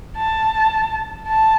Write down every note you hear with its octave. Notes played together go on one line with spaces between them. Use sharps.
A5
A5